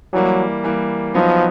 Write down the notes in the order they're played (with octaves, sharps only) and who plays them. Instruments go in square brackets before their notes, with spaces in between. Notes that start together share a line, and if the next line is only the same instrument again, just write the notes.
[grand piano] E3 G3 A#3 [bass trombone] F#3
[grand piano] E3 G3 A#3
[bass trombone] F3 [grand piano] F#3 B3 D#4